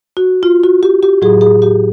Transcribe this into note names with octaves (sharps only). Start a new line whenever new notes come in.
F#4
F4
F#4
G4
G4
A2 F#3 G#4
G#4
G4